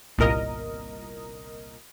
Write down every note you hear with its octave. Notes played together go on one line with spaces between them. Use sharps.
G1 C2 A#2 A#4 D#5